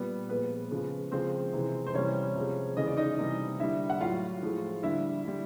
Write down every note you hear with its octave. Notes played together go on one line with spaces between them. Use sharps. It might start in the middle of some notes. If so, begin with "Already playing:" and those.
Already playing: A#2 G3 B3 B4
A#2 F3 G#3 B3 B4
C#3 F3 G#3
C#3 F3 G#3 C4 C5
C3 E3 G#3
C5
C3 E3 G3 C#4 C#5
C3 F3 G#3
C#3 E3 G#3 D#5
D5
D#4 D#5
C3 E3 G3
D3 G3 E4 E5
F#5
A2 F#3 F4 F5
A2 F3 G#3
D3 G3 E4 E5
D3 G3